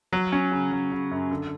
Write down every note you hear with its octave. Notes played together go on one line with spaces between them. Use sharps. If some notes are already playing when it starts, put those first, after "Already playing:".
F#3
C#4
C#3
F#3
C#3
F#2
D3